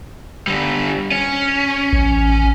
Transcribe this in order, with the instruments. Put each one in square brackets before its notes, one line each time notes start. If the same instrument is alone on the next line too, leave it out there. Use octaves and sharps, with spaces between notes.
[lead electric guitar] D3 G3
C#4
[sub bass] A1